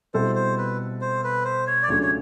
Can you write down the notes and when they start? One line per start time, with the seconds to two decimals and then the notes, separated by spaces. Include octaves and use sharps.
0.14 B2 G3 C4 E4 A4 C5
0.35 C5
0.58 B4
1.01 C5
1.24 B4
1.45 C5
1.67 C#5
1.83 D5
1.89 C#2 C#3 F#3 A3 D4 C#5
2.02 C#5